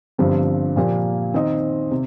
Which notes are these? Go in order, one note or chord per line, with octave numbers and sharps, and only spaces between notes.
G1 G2 F3 C4 G4
A#2 F3 A#3 G4
D#3 C4 D#4 C5 D#5
C3